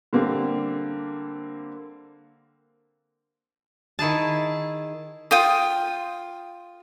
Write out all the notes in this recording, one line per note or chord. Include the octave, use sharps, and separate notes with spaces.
D3 G3 A#3 C4
D#3 E4 G#4 A5
F4 G5 D#6